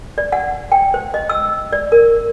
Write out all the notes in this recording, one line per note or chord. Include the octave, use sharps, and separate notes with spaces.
D5
F#5
G5
C5
D#5
E6
D5
A#4